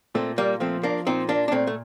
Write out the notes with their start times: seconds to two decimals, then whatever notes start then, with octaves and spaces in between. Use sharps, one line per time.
0.15 A#2 A3 C4
0.38 G3 A#3
0.60 F3 A3 C4
0.83 A#3 D4
1.07 A#2 C4 D#4
1.29 A#3 D4
1.48 D4
1.51 A#2 A3 C4
1.67 A3